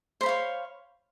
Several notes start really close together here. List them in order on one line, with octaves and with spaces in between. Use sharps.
C5 B5 F5 C#5